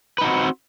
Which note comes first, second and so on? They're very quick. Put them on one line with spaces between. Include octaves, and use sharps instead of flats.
B4 D#4 F#4 C4